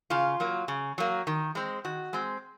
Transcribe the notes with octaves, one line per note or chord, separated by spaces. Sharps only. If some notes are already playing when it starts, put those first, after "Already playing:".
C#3 F4
F#3 A#3
C#3
F#3 A#3
D#3
G#3 C4
D#3 F#4
G#3 C4